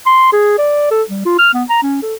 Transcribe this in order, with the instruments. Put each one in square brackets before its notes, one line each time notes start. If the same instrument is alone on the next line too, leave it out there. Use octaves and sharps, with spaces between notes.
[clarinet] C6
G#4
D5
A4
G3
F4
F6
B3
A#5
C#4
A4